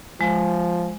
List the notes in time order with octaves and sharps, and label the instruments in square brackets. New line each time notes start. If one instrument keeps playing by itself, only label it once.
[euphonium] F3 [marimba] G#3